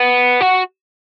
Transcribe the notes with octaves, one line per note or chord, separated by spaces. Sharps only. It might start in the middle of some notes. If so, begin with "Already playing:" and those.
Already playing: B3
F#4